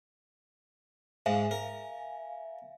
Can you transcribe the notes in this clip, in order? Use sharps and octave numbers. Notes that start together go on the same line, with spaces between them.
G#2 E5 F5 G#5
A#4